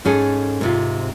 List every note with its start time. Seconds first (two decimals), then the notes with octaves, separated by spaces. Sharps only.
0.05 G#2 C#4 G#4 A4
0.61 G#2 C3 F4